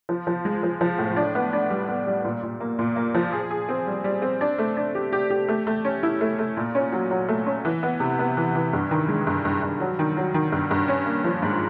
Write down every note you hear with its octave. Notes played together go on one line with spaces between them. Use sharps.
F3
F3
G#3
F3
F3
A2
D4
B3
D4
G3
B3
G3
A#2
A#2
A#3
A#2
A#3
F3
G#4
G#4
C4
G3
G3
C4
D4
A3
D4
G4
G4
G4
A3
A3
C#4
E4
A3
A3
A#2
C#4
F#3
F#3
A3
C#4
E3
B3
C3
B3
E3
E3
G2
D#3
G#3
G2
G2
G2
F#3
D#3
F#3
D#3
G2
G2
C#4
A#3
F3
G#2